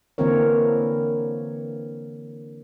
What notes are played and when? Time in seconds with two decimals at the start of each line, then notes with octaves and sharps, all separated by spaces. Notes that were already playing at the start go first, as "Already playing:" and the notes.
0.18 D3 E3 A#3 C4 A#4 C#5